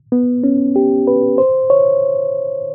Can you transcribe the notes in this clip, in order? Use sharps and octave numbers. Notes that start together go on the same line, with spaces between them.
B3
C#4
G4
B4
C5
C#5